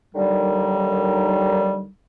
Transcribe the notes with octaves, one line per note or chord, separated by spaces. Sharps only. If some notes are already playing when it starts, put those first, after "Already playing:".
D#2 D3 D#3 F#3 G3